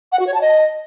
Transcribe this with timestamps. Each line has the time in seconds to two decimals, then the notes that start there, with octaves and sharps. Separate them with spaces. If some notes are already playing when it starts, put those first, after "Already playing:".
0.12 F#5
0.19 F#4
0.27 C#5
0.34 A5
0.41 D#5